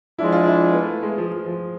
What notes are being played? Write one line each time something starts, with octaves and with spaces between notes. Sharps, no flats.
F3 G#3 D4 E4
F4
E4
B3
A3
G#3
F3
F3
F3